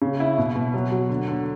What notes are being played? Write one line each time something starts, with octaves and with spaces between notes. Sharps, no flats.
C#3
E4
B2
B2
F#3
F#3
D3
D3